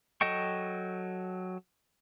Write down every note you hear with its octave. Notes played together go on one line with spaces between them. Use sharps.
F#3 A4 D#5 G5 C#6